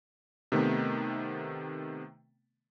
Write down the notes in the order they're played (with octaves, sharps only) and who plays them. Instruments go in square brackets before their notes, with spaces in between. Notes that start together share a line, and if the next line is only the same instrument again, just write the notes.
[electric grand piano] C3 D#3 A3 B3